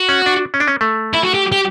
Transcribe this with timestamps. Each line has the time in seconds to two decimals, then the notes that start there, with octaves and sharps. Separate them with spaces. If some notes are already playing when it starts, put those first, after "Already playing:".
Already playing: F#4
0.09 C#4
0.26 D4
0.54 C#4
0.60 D4
0.68 C#4
0.81 A3
1.14 E4
1.24 F#4
1.34 G4
1.52 G4